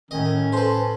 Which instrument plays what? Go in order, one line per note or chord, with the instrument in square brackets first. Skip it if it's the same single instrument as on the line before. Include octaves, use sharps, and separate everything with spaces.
[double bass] A2 [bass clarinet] D#3 [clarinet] C#4 [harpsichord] D#5
[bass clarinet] A4 [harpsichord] B4 C5